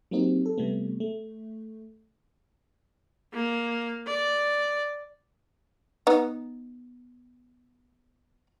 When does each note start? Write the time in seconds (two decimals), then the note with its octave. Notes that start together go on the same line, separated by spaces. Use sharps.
0.11 F#3 A#3 C4 D#4 G4
0.46 A4
0.58 C3 G3 A3 B3
1.00 A3
3.34 A#3
4.07 D5
6.07 B3 D#4